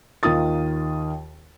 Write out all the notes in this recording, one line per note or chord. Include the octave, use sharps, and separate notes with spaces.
D#2 D#3 F4 D#6 A6